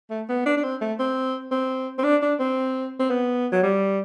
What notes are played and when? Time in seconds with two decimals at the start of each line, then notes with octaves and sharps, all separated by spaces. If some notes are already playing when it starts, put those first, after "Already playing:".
0.10 A3
0.29 B3
0.46 D4
0.57 D4
0.63 C4
0.81 A3
0.99 C4
1.51 C4
1.98 C4
2.03 D4
2.22 D4
2.39 C4
2.99 C4
3.10 B3
3.52 F#3
3.63 G3